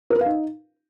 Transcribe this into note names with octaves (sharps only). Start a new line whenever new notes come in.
A#4
B4
F5
D#4